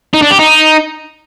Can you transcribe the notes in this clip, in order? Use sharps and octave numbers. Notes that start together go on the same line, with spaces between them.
D#4
D4
G4
D#4